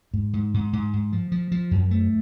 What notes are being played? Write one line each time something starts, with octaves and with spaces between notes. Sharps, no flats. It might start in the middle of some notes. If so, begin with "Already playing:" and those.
G#2
G#2
G#2
G#2
G#2
F3
F3
F3
F#2
A3